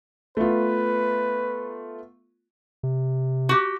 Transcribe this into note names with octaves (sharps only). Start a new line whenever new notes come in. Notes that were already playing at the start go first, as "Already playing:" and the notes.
A3 B3 F4 B4
C3
F#4 G4